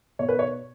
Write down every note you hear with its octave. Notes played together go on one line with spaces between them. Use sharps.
B2 C#5
B4
C#5